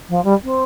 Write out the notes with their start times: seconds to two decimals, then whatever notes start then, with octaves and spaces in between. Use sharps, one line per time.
0.09 F3
0.24 G3
0.43 C4